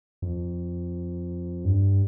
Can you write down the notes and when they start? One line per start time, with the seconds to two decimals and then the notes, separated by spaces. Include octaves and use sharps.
0.22 F2
1.64 G2